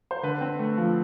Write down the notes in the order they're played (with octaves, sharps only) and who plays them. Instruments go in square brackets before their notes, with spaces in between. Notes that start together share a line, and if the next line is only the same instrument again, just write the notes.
[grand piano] C5
D3 B4
C4
A3
F3